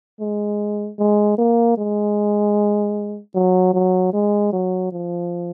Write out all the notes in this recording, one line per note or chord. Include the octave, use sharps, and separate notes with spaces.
G#3
G#3
A#3
G#3
F#3
F#3
G#3
F#3
F3